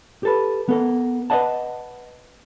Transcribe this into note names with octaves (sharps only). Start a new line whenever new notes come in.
G4 A4 B4
B3 A4 A#4
B4 C5 D5 D#5 F#5 A5